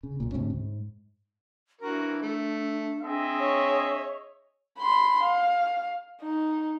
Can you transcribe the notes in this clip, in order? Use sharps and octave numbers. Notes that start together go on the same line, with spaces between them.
C#3
B1 A#2
D2 G#2 C3 C#4
G#2
E3 D4 F#4 A#4
A3
C4 G#4 D#5 E5
C#5
B5 C6
F5
D#4